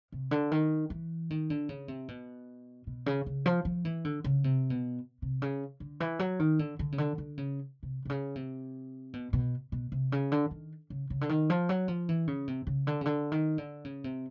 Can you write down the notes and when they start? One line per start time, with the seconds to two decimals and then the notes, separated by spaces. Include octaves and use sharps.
0.12 C3
0.31 D3
0.51 D#3
0.90 E3
1.30 D#3
1.50 D3
1.69 C#3
1.88 C3
2.08 B2
2.87 B2
3.06 C#3
3.26 C#3
3.46 F3
3.65 F3
3.85 E3
4.05 D3
4.24 C#3
4.44 C3
4.70 B2
5.22 C3
5.42 C#3
5.80 D3
6.00 E3
6.19 F#3
6.39 D#3
6.59 D3
6.79 D3
6.92 C#3
6.98 D3
7.18 D3
7.37 C#3
7.83 C3
8.05 C3
8.09 C#3
8.35 C3
9.13 B2
9.33 B2
9.72 B2
9.92 C3
10.12 C#3
10.32 D3
10.51 D#3
10.90 C#3
11.10 C#3
11.21 D3
11.29 D#3
11.50 F3
11.69 F#3
11.88 F3
12.09 E3
12.27 C#3
12.47 C3
12.67 C#3
12.87 D3
13.01 C#3
13.05 D3
13.32 D#3
13.58 D3
13.84 C#3
14.04 C3